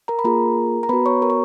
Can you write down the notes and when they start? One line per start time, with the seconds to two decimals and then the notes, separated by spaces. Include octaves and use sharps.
0.08 A#4 A#5
0.19 B5
0.24 A#3 F4 G#4 A#4 A#5
0.83 A#5
0.89 B3 F#4 B4 B5
1.06 C#5 C#6
1.22 A#4 A#5
1.30 C#6